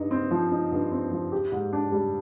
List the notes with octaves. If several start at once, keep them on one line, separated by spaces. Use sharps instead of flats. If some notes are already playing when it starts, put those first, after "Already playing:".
Already playing: G2 D#4
C4
F3
D#4
G2
C4
F3
G4
G#2
D4
G3